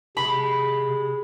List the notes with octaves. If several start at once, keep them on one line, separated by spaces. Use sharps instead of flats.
C3 G#3 B5